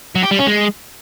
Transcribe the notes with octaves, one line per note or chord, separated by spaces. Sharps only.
F#3
G4
G3
C#4
G#3